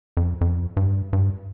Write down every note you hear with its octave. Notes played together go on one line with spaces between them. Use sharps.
F2
F2
G2
G2